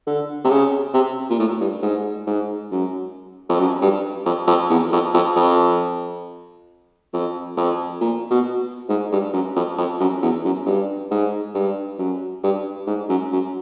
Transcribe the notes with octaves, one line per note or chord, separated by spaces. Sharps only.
D3
C3
C#3
C3
A#2
A2
G2
G#2
G#2
F#2
F2
F#2
G2
F2
F2
E2
F2
F2
F2
F2
F2
A#2
B2
G#2
G2
F#2
F2
F2
F#2
E2
F#2
G2
G#2
G2
F#2
G2
G#2
F#2
F#2